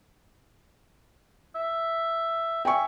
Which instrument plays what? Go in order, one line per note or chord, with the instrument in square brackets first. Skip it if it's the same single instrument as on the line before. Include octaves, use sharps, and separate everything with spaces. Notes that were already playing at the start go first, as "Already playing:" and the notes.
[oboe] E5
[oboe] E5 [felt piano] G5 G#5 C#6